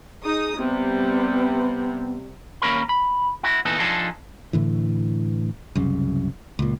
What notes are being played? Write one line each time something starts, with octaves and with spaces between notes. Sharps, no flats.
D#4 G#4 D#6
C3 G3 B3
D#2 A#3 C#4 A#4 B5
B5
E4 F#4
A#2 E3 B3 D#4 F#4 A4
F3 D4 D#4 G#4 A4
A2 D3 E3
C2 F#2 C#3
C#2 A#2